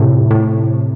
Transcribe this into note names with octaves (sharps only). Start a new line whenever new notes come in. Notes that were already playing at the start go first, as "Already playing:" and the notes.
Already playing: A2 C3
A2